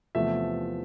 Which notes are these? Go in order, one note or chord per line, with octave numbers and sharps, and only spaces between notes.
E2 C3 F3 A3 E5